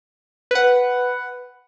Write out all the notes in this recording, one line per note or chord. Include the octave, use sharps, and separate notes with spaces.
B4 F#5